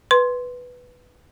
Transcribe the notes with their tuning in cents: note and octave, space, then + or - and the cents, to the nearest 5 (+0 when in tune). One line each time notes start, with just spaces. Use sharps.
B4 +0 C6 +0